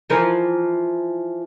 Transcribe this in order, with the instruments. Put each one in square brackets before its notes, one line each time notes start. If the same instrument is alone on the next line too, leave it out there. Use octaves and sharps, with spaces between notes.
[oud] E3 F3 A#4